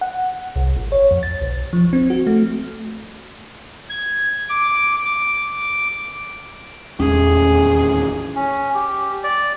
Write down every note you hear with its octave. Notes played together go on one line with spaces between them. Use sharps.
F#5
C2
A1
C#5
F2
A6
B1
F3
C4
F#4
A3
G#6
D6
D6
D#1 A1 E2 G#3 C#4 G#4
C#4
G4
D5